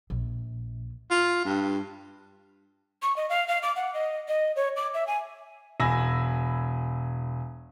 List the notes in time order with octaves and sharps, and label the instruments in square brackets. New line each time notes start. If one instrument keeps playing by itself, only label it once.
[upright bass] A#1
[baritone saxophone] F4
G2
[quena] C#6
D#5
F5
F5
D6
F#5
D#5
D#5
C#5
D6
E5
G#5
[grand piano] E1 G#5 B5 E6 A#6